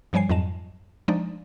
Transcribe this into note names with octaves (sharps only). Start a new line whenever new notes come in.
G2 F3 G3 C#5 G#5 C7
F2 G#2 F#3 D#5 A5 E7
F3 G#3 D4 D#4 D5